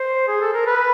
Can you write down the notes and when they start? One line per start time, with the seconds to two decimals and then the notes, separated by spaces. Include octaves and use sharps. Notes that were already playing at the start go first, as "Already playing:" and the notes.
Already playing: C5
0.28 G#4
0.41 A4
0.53 A#4
0.66 B4